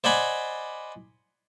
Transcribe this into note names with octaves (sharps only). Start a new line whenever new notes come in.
C5 D5 D#5 F#5 G#5 B5